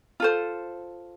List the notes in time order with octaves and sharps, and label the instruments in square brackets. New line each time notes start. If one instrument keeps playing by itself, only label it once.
[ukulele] F4 A4 C5